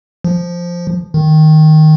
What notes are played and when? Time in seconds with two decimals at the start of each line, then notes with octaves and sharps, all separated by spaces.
0.24 F3
1.14 D#3